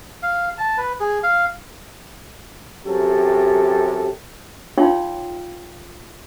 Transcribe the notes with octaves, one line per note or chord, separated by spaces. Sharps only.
F5
A5
B4
G#4
F5
F#2 C3 G4 A4
D#4 F4 C#5 F5 G5 C6